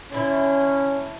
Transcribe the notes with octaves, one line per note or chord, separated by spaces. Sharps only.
D3 C#4 E4